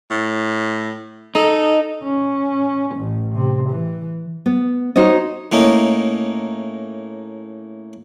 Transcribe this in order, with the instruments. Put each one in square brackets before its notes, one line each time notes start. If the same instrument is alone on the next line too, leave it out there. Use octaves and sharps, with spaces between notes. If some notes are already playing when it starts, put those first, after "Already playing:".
[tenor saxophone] A2
[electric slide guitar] D#4 [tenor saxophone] A4
[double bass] C#4
A1
C3
E3
[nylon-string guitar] B3
D#4 F#4 C5 C#5 D#5
[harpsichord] A2 A#3 C#4 D#4